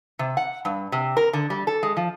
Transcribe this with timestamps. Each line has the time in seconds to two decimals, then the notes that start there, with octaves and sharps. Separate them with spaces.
0.19 C3
0.37 F#5
0.65 G2
0.92 C3
1.17 A#4
1.33 D3
1.50 G3
1.67 A4
1.83 G#3
1.97 F3